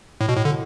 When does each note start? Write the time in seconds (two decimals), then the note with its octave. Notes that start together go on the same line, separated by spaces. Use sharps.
0.21 A2
0.29 B2
0.37 A2
0.45 D3